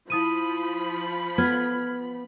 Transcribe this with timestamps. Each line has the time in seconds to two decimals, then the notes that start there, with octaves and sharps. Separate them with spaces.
0.10 F3 E4 B5 D#6 D#7
1.38 B3 F6 G#6